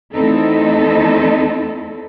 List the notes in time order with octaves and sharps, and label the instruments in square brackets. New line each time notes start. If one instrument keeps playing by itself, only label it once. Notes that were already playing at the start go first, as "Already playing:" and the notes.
[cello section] E2 A3 C4 D#4 E4 A4